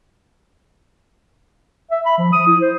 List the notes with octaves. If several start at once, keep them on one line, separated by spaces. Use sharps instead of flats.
E5
B5
F3
D#6
E4
C5